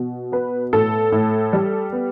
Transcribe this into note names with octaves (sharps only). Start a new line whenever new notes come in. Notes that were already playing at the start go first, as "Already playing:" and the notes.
Already playing: B2
B3 B4
A2 A4
A2
G3
B3